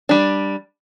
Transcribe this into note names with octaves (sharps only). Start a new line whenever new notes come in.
G3 D4